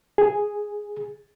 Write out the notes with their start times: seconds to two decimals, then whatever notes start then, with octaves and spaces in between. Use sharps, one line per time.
0.18 G#4